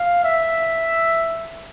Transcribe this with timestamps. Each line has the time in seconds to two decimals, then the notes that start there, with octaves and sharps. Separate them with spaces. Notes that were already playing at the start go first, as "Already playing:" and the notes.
Already playing: F5
0.24 E5